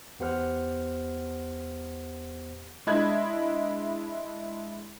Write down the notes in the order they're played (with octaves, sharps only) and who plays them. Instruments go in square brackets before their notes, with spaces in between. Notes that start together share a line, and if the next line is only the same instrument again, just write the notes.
[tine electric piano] E2 B3 G4 C5 F#5 F6
[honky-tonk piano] G#3 D4 E4 D#5 G#6